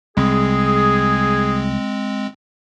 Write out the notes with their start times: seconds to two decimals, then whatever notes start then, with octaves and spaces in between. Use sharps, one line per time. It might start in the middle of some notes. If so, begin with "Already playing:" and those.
0.17 C2 G#3 C4 G#4